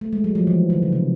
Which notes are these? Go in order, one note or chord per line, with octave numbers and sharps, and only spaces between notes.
A3
G#3
F#3
F3
E3
D#3
C#3
C3